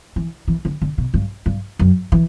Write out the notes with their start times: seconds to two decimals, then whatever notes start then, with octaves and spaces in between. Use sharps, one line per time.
0.16 E3
0.48 E3
0.65 D3
0.82 D3
0.98 B2
1.14 G2
1.46 G2
1.79 F#2
2.12 E3